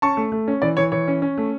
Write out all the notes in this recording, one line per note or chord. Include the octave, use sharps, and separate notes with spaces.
C#4 A5 C#6
A3
A3
C#4
E3 D5
E3 C#5
E3 C#5
C#4
C#4
A3